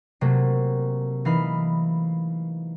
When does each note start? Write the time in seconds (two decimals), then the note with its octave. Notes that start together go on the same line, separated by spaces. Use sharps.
0.21 C3 F#3 A3 A#3
1.25 E3 D#4 F5 B5